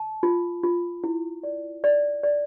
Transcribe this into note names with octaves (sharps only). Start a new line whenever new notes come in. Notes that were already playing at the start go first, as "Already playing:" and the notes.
Already playing: A5
F4
F4
E4
D5
D5
D5